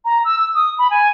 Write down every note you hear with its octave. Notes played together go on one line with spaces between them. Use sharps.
A#5
E6
E6
D#6
B5
G#5